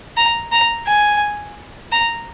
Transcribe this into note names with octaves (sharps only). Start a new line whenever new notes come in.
A#5
A#5
G#5
A#5